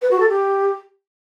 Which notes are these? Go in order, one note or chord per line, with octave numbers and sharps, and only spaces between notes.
B4
F#4
A4
G4